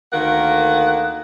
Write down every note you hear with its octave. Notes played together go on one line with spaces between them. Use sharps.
D2 D#3 A#3 F#5